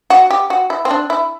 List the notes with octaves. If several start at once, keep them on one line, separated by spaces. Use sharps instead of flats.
F#4
G4
F#4
E4
C4
D4
E4